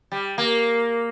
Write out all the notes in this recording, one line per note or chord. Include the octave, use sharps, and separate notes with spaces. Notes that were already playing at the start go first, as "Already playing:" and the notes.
G3
A#3